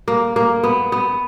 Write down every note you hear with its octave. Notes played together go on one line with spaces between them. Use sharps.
A#3
A#3
B3
B3